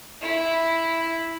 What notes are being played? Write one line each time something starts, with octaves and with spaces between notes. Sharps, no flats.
E4